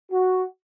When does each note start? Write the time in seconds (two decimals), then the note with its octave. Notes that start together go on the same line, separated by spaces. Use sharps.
0.11 F#4